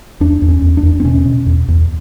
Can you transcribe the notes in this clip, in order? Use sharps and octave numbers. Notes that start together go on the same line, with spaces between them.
E2 D4
E2
C#4
E2
D4
E2
C4
B2 C#4
B2
E2
E2